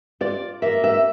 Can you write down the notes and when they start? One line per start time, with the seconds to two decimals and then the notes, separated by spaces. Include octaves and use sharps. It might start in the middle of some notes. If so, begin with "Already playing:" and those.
0.21 F4 D5
0.62 A#3 E5
0.84 E5